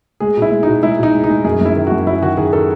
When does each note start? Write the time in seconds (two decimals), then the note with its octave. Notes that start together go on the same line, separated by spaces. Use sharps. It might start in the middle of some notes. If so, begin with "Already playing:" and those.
0.20 G#3 G#4
0.37 B2 E4
0.51 G#3
0.63 D#4
0.67 B2
0.83 G#3 E4
0.98 B2 D#4
1.14 G#3
1.24 D#4
1.30 G#3
1.44 F#2 G#4
1.61 F#2 E4
1.76 D#3
1.87 F#4
1.92 F#2
2.06 F#3 E4
2.22 D#3 F#4
2.37 D#3 G#4
2.53 D#3 A4